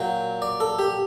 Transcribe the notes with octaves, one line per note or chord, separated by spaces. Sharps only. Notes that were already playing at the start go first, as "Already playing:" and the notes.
Already playing: A#2 F#3 G5
D5
A4
G4